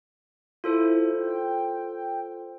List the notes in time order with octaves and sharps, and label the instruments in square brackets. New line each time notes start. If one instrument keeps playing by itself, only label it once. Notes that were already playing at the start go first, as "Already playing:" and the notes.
[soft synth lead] E4 [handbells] F4 A4 C5
[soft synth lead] G5